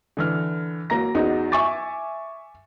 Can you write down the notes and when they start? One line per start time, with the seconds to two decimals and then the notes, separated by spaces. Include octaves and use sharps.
0.17 D3 E3 F6
0.90 F#3 A#3 A#5 A#6
1.15 E2 D#4 F#4
1.52 E5 G#5 C#6 D6 A6